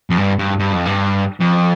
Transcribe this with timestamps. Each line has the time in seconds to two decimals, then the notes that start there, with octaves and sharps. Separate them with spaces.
0.10 F2
0.18 G2
0.39 G2
0.59 G2
0.73 F2
0.85 G2
1.40 F2